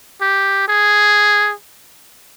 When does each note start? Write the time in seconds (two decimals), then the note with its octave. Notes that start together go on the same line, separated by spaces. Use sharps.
0.21 G4
0.68 G#4